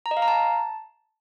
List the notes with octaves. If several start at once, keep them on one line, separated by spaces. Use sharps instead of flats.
A#5
D#5
F5
A#5
A5